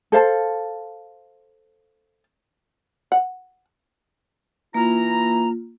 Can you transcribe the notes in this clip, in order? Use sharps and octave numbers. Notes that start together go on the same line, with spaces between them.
A4 C5 F5 A5
F#5
E3 A#3 E4 F4 A#5